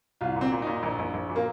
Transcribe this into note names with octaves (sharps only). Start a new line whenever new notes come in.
C2 F4
A#2 C4
A#2
A#2 D#4
A#1
A#1
A#1
A#2
A#3